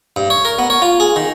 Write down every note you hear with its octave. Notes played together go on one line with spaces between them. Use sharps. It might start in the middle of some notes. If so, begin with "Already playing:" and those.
G2
C#5
A#4
B3
C#5
F4
G#4
D#3